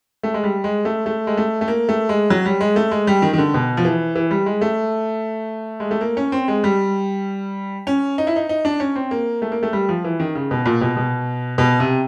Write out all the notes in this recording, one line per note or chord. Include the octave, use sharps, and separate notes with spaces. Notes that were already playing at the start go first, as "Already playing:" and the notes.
A3
G#3
G3
G#3
A3
A3
G#3
A3
A3
A#3
A3
G#3
F#3
G3
G#3
A3
G#3
G3
D#3
D#3
D3
B2
F3
E3
E3
G3
G#3
A3
G#3
A3
A#3
C#4
C4
G#3
G3
C#4
D#4
E4
D#4
D#4
D4
C#4
C4
A#3
A3
A#3
A3
G3
F3
E3
D#3
C#3
B2
A#2
B2
B2
B2
C3